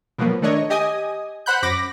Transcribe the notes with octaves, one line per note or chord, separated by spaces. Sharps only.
B2 F3 F#3 A#3 B3
D#3 A3 D4 C#5 D#5
G4 D#5 G#5 D#6
C5 F#5 B5 F#6 G6
F#2 B5 D6 A#6